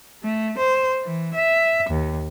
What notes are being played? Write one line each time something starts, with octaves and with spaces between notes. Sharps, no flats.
A3
C5
E3
E5
D#2